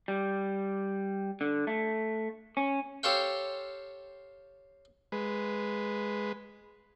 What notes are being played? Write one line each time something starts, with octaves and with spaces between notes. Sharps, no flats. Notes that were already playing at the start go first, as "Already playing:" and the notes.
G3
D3
A3
C#4
G4 A4 C5 C#5 F5 G5
G#3 B4